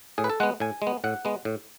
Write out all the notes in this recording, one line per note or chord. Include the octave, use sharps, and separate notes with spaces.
A2 G#4
B4
A4
G#3 B3 F#5
A2 G#5
G#3
B3
A2 F#5
G#3 B3
A2